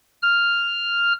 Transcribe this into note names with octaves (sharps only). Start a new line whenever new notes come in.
F6